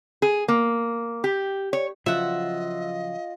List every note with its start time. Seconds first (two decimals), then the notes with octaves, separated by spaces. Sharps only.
0.22 G#4
0.48 A#3
1.24 G4
1.73 C#5
2.06 C#3 F3 F#3 F4 D#5 E5 F#5